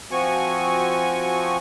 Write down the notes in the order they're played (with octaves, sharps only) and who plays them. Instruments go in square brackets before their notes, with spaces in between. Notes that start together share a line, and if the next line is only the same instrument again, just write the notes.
[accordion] F3 C4 F#4 G#5 C#6